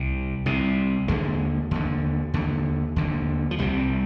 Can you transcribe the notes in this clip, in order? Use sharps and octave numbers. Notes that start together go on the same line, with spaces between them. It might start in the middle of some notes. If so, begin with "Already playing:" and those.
Already playing: C2 C3
C2 C3
D#2 D3 G#3
D#2 D3
D#2 D3
D#2 D3
F3
C2 C3 G3